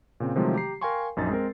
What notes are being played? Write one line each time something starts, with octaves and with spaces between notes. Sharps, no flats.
A#2 C#3 C4
C3 D#3 F3 F#3 G#3 A3
G4 A#5 C7
A#4 F5 G5 G#5 C6 C#6
A#1 F#2 D#4 A6
G#3 C4 A#4